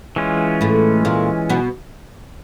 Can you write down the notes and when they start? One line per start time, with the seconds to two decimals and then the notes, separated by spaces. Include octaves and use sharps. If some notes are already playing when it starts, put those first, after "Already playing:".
0.16 E3 G#3 C#4 F4
0.61 A2 A3
1.05 A#2 A#3
1.49 B2 B3